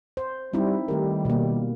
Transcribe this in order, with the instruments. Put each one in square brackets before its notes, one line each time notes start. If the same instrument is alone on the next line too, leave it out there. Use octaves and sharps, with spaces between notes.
[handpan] C5
[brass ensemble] G3 [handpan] C4 D#4 E4
[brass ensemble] D#3 G3 [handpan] A3 G4 A#4
[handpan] B2 A#3